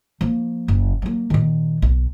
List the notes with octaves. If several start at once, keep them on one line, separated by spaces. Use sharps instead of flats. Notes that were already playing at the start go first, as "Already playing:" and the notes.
F3 A#3
F#1
F#3 A#3
A#2 D#3
B1